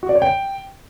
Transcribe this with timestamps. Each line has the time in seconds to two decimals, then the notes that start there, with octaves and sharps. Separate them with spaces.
0.03 F#4
0.09 D5
0.15 C#5
0.22 G5